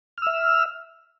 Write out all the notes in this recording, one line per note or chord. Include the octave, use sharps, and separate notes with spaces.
E5 E6 F6